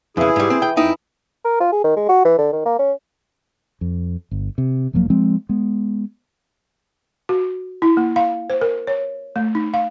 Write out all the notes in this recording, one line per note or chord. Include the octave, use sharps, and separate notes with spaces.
F2 C#3 E3 E4 G#4
G#2 G3
C4
G5
F2 D#4 E4 G5
A#4
F4
G#4
D#3
G#3
F#4
E3
D3
D#3
A#3
C#4
F2
G1
C3
E1 F3 F#3 A#3
F3 G#3 C4
G#3 B3
F#4
E4
A#3
F5
C5
A#4
C#5
A3
D#4
F5